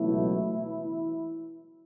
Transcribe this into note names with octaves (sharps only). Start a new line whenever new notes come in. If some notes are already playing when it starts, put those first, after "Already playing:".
Already playing: C#2 B2 E3 F#3 A3 E4